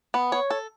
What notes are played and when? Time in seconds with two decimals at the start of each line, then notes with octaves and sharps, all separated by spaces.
0.14 B3
0.32 C#5
0.50 A4